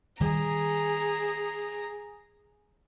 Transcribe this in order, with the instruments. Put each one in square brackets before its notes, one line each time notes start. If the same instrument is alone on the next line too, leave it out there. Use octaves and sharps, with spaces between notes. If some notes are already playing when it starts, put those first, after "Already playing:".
[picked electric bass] D#3 G3 [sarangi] G#4 [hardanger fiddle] A#5